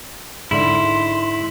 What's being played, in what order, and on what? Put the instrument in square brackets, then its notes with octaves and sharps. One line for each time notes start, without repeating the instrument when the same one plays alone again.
[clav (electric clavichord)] G#2 D3 [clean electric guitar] E4 [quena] C6